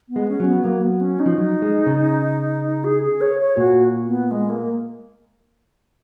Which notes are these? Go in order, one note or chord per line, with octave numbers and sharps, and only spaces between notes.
B3
G#3
C#4
F#3
B3
F#3 A#3
B3
C#4
D#4
F3
F#3
G#3
C#3
G#4
G#4
C#5
C#5
A#2 F#4
B3
G#3
A#3